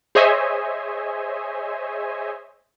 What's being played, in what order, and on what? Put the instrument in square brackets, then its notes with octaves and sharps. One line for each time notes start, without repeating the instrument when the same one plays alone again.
[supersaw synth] G#4 C5 C#5 D#5 E5 G#5